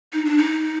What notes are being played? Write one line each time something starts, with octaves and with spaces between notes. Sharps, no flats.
D#4
D4
D#4